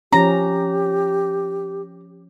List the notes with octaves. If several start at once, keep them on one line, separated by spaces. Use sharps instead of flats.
F3 C#4 G4 A#5